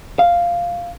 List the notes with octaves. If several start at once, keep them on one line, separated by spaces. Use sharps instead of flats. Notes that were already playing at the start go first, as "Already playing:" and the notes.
F5